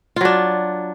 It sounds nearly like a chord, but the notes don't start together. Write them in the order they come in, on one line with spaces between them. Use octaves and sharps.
F4 F#3 D4